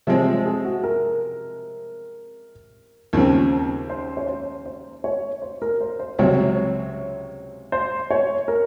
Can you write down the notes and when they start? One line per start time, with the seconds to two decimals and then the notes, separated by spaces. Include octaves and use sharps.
0.07 C3 F3 G#3 C4 C#5
0.26 C5
0.46 G#4
0.65 F#4
0.84 A#4
3.13 D#2 C#3 F3 C4
3.89 C5
4.17 C#5
4.27 C5
4.66 C5
5.04 C#5
5.42 C5
5.62 A#4
5.81 C5
5.99 C5
6.19 C#2 C3 F#3 C4 C#5
7.72 C5
8.11 C#5
8.48 A#4